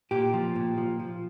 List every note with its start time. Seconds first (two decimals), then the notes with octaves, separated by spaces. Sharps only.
0.11 A#2 G4
0.34 F3
0.56 A#2
0.78 F3
1.00 F3